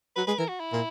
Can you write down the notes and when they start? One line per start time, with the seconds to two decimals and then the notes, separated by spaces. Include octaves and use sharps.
0.16 F#3 B4
0.27 G#3 B4
0.38 E3 A#4
0.49 F#4
0.60 E4
0.73 A#2